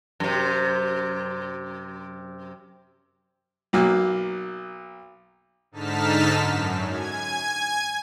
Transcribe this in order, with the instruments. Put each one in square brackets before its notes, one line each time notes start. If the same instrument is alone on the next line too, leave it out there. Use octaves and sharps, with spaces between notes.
[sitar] F#2 C3
[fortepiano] B1 F#3 A#3
[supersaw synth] G#2 D3 D#4 A5 F6 B6
F#2
G#5 G#6